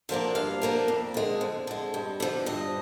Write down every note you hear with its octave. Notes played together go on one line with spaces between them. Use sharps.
D3 F3 A#3 D4 F5
G2 F5
D3 F3 A#3 D4
F2
D3 G#3
F2
D3 G#3
G2
D3 F3
G2 D#5